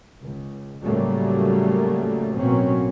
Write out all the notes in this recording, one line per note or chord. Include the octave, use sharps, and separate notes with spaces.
C#2
A2 C#3 F#3 G3 A3 A#3
A1 B2 F#3 A#3 C4 C#4